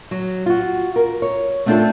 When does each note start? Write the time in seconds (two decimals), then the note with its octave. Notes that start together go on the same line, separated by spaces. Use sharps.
0.11 F#3
0.46 F4 F#4
0.96 A#4
1.22 C#5
1.66 A3 B3 C4 D4 F4 A4